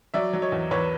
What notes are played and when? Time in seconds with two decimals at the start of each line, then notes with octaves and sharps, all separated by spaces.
0.14 F#3 D5 E5
0.33 F#3
0.42 C#5 D#5
0.52 E2
0.71 E2 B4 C#5